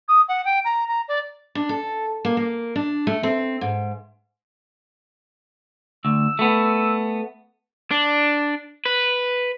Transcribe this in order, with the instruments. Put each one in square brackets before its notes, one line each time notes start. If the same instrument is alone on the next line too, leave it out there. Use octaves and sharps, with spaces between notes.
[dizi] D#6
F#5
G5
A#5
A#5
D5
[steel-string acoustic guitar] D4
A4
A#3
A#3
D4
A3
C4
G#2
[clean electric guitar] D2 [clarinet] E6
[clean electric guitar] A3 B3
[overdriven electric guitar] D4
B4